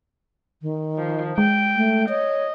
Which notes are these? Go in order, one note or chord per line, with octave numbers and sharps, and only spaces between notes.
D#3
F3
G#3 G5
A3
C#5 D#5